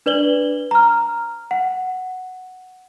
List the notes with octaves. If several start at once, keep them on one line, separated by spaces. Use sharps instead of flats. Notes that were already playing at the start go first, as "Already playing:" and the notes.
D4 B4 D5 F#7 G7
A#5 F6
F#5